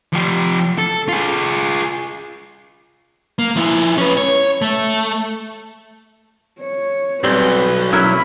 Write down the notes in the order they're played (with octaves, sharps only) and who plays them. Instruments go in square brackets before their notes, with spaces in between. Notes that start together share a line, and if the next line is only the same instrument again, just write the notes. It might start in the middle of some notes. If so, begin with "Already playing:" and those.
[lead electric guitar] F3 G4
A4
F4 G#4
A#3
F3 E4
C#4 B4
C#5
A3
[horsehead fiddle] C#5
[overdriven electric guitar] B1 [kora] G3 [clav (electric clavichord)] C4 [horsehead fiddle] B4
[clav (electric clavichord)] F#3 C#4 E4 [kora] A#4 E5 [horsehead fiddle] B5